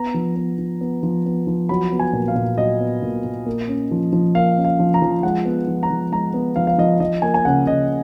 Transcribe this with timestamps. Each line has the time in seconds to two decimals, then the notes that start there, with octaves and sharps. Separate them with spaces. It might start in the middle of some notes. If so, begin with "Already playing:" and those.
Already playing: B3 A#5
0.14 F3
0.36 B3
0.58 F3
0.81 B3
1.03 F3
1.26 B3
1.47 F3
1.69 F#3 B5
1.92 B3
1.99 G#5
2.13 A#2
2.28 F5
2.35 A#2
2.58 F#3 D#5
2.80 B3
3.02 A#2
3.24 A#2
3.46 A#3
3.68 C#4
3.91 F3
4.13 F3
4.35 A#3 F5
4.58 C#4
4.65 F5
4.79 F3
4.94 A#5
5.02 F3
5.23 G#3 F#5
5.45 B3
5.67 F3
5.83 A#5
5.90 F3
6.12 G#3 A#5
6.34 B3
6.56 F3 F5
6.67 F5
6.78 F3 D#5
7.00 F3 D#5
7.22 A#3 G#5
7.34 G#5
7.45 C#3 F#5
7.67 C#3 D#5